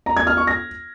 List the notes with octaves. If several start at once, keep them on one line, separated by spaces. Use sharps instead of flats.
A#5
G#6
F6
C#6
A#6